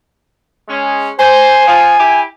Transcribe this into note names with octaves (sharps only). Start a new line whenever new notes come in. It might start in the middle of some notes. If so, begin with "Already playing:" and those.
G#3 C#4
C5 G#5
F3
E4 G4